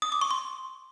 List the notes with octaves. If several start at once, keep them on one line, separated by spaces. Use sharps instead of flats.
D#6
D6
C#6
C6